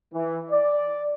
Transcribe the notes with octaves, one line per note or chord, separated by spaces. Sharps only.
E3
D5